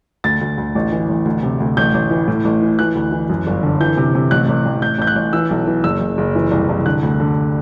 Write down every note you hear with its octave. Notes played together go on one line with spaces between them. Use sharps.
D2 A6
D2
D2
A1
E3
A1
D2
C3
D2
A1 G6
A1
E3
A2
A1
E3
E3 F#6
D2
E3
F#2
G1
D3
E3 G6
C3
C3
A1 F#6
A1
A1
A1 G6
A1 G6
F#6
A1
E3 E6
B1
E3
F#1 E6
F#1
F#1
E3
C2
C2
D3 F#6
D2
D3